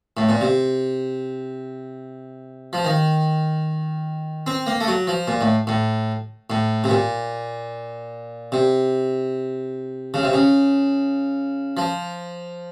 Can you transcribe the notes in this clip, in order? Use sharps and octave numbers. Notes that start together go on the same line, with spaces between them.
A2
A#2
C3
F3
D#3
C4
A#3
A3
F#3
F3
A#2
A2
A2
A2
C3
A#2
C3
C#3
C3
C#3
F3